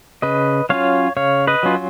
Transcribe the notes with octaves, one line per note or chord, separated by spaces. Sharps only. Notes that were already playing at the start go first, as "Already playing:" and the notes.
C#3 B4 D#5
F#3 C#4 F4 C#5 F5
C#3 C#5 F5
B4 D#5
F#3 C#4 F4